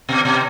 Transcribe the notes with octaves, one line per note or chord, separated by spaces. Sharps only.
B2
B2